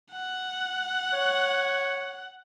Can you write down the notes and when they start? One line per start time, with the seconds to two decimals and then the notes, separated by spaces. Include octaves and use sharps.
0.12 F#5
1.13 C#5